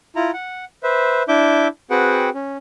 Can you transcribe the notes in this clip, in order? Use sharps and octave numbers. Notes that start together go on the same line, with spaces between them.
E4 F4 A#5
F#5
B4 C5 E5
D4 E4 E5 D6 G6
C4 F#4 G#4 B4 F#5 G5
C#4